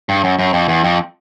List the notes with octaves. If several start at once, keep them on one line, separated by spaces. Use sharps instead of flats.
G2
F#2
F#2
F2
E2
F2